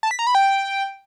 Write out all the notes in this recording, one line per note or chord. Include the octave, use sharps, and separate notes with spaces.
A5
B6
A#5
B5
G5